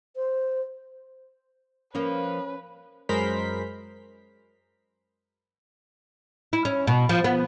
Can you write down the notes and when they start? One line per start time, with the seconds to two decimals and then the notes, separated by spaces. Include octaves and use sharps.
0.16 C5
1.95 F3 A#3 C#4 B4
3.09 F#2 G#3 A#4 C5 B5 B6
6.53 E4
6.65 C#4
6.87 B2
7.09 F3
7.24 B3